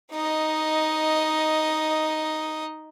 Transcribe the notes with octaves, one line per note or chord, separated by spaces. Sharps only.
D#4 D#5